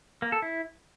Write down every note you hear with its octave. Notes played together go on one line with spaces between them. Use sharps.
A#3
A4
E4